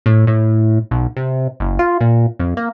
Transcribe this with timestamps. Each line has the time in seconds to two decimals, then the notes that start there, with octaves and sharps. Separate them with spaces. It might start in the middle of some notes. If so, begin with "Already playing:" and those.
0.06 A2
0.27 A2
0.91 B1
1.17 C3
1.60 F#1
1.79 F4
2.00 A#2
2.40 F2
2.57 A#3